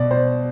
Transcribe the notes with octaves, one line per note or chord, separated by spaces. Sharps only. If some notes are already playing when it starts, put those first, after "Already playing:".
Already playing: B2 D5
C5